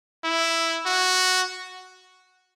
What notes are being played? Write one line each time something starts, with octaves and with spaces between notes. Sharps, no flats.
E4
F#4